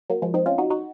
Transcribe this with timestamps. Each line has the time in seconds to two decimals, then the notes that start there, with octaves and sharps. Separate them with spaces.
0.10 F#3 A#3
0.22 F3 G#3
0.34 C4 D#4
0.46 C#4 F4
0.58 D#4 F#4
0.70 D#4 F#4